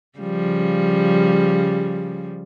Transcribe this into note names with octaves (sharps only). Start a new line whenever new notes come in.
C#3 F3 G3